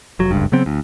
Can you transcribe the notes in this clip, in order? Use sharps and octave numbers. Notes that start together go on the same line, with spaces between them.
F1 F#3
F#1 C#2 G2
C#3 F#3 B3 C4
D2